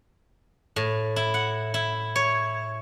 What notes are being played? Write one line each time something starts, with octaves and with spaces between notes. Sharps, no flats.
A2
E4
F#5
E4
C#5